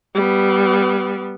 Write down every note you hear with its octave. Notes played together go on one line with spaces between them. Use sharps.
G3 B3